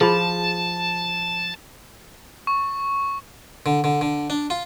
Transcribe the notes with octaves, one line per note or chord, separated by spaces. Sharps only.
F3 G#4 A5 B5
C#6
D3
D3
D3
D4
F4